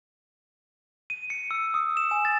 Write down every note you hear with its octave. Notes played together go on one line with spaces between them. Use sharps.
D#7
C#7
E6
D#6
E7
G#5
A6